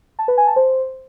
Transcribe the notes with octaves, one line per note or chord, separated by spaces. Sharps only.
A5
B4
G#5
A5
C5